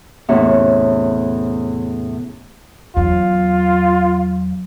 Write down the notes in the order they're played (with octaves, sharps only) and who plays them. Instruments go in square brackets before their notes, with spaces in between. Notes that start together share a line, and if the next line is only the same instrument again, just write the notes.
[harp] E2 A2 C3 C#4
[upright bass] E2 F#3 [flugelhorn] F4